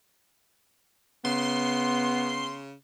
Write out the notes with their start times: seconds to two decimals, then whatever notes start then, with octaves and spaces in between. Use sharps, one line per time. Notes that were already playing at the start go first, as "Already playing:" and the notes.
1.25 C#3 B3 C6